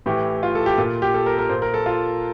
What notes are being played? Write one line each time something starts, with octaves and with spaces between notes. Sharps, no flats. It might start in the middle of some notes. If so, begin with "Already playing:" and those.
A2 E3 G4
F4
A4
G4
A#2 F4
G4
A4
A#4
A#4
A#2 C5
A#4
A4
F4